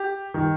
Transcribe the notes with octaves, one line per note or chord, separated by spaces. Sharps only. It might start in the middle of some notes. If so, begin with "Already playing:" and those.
Already playing: G4
D#3